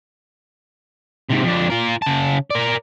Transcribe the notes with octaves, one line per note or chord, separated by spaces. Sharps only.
G#2 C3
F2 D4
F4 A#4
C#3 A5
A#4 D5